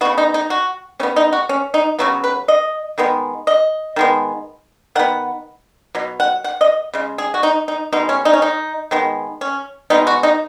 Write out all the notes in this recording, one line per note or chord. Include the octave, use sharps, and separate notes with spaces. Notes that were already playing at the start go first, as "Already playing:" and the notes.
C#3 B3 F#4
D#4
D#4
F#4
C#3 B3 C#4
D#4
F#4
C#4
D#4
C#3 F#3 B3 F#4
B4
D#5
D#3 G#3 B3
D#5
D#3 G#3 B3
D#3 B3 F#5
B2 F#3
F#5
F#5
D#5
C#3 G#3
G#4
F#4
D#4
D#4
B2 G#3 B3 D#4
C#4
D#4
C#4
D#4
D#3 G#3 B3
C#4
B2 G#3 B3 D#4
F#4
D#4